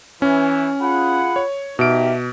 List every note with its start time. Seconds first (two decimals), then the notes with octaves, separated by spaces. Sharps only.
0.22 E3 C#4
0.81 F4 G#4 F#5 B5
1.36 C#5
1.79 B2 D#4 G4 A#4 E5 D7